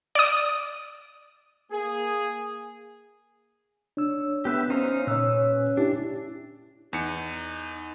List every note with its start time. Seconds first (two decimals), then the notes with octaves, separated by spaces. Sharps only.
0.15 D5 D#6
1.72 A#3 G#4
3.97 D4 C#5 E6
4.45 B3 G4 B4 E5
4.70 C#4 D#4 C5 F5
5.07 A#2 B4 C#5 E6
5.77 D4 E4 G4
6.93 E2 D#4 C#7